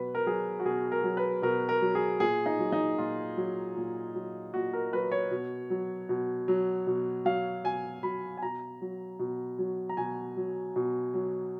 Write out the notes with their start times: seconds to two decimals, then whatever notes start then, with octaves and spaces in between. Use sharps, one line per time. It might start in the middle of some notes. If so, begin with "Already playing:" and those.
Already playing: B2 F#3 B4
0.15 A#4
0.26 F#3 G#4
0.59 F#4
0.65 B2 G#4
0.92 A#4
1.03 F#3
1.17 B4
1.42 B2 A#4
1.69 A#4
1.82 F#3
1.95 G#4
2.20 A#2 G#4
2.46 D#4
2.59 F#3
2.72 D#4
2.98 A#2 F4
3.37 F#3
3.77 A#2
4.14 F#3
4.54 A#2 F#4
4.73 A#4
4.93 F#3 B4
5.12 C#5
5.31 B2
5.70 F#3
6.09 B2
6.48 F#3
6.87 B2
7.25 F#3 F5
7.64 B2 G#5
8.03 F#3 B5
8.37 G#5
8.42 B2 A#5
8.81 F#3
9.19 B2
9.58 F#3
9.89 A#5
9.97 B2 G#5
10.37 F#3
10.76 B2
11.14 F#3